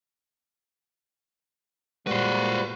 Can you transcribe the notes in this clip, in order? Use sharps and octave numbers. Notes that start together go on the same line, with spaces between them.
A#2 G3 G#3 F4 F#4 B4 C5